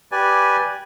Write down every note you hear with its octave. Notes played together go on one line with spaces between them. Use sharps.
G4 B4 D5 G#5